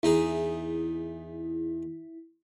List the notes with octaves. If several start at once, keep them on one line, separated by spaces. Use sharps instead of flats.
E2 D#4 E4 G#4